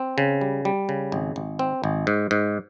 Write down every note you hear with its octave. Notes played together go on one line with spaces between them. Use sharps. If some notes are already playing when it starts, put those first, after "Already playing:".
Already playing: C4
C#3
G3
G3
C#3
G#1
G#1
C4
G#1
G#2
G#2